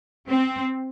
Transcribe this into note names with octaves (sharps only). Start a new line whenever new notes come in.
C4